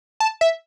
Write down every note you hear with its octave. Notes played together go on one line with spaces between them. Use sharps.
A5
E5